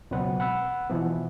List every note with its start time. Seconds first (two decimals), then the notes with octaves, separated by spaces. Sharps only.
0.11 C#2 B2 F#3 C4 B4 F#5
0.40 F#5 B5 E6 F#6
0.90 B2 E3 F3 B3